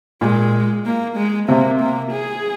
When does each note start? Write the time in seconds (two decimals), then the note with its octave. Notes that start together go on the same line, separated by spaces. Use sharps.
0.21 A#2 G#3
0.85 A#3
1.17 G#3
1.48 C3 A#3
1.80 A#3
2.12 G#4